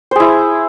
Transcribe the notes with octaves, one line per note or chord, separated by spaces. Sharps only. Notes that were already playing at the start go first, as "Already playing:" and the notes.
E4 G#4 C5